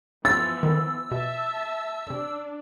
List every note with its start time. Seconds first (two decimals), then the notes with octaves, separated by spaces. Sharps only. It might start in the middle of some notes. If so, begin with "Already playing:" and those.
0.25 E3 F3 B3 E6 A6
0.63 D3 D#3
1.11 B2 E5 A5
2.10 C3 D4